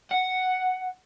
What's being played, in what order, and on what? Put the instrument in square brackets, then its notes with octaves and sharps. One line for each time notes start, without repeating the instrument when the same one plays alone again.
[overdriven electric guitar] F#5